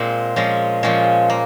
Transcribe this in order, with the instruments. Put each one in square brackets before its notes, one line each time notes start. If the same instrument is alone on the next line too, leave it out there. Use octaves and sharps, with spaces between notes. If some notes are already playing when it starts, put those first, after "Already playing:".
Already playing: [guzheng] A#2 G#3 C4
A#2 F3 G#3 C#4
A#2 F3 G#3 C#4
A#3